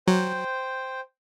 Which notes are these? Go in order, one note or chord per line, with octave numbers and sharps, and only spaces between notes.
F#3 C5 G5